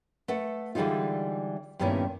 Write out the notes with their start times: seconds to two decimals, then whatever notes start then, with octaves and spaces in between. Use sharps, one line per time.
0.28 A3 B4 F#5
0.75 D3 E3 G3 G#3 D#4 F4
1.79 G2 A#2 D#3 B3 C#4 E4